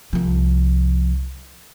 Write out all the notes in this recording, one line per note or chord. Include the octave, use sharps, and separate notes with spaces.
C2 F3